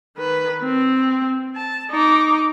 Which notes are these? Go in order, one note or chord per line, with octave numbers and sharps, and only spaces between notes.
D#3 B4
C4
A5
D#4 D6